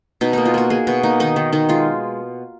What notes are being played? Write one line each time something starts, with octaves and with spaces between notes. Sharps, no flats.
B2 D#4
A#3 D#4
F4
A#3 F#4
A#3 G#4
B2 F#4
A#3 D#4
D#3 D#4
D#3
D#3 D#4
G#3 F4